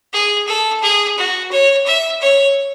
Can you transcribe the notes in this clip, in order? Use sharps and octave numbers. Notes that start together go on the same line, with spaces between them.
G#4
A4
G#4
F#4
C#5
E5
C#5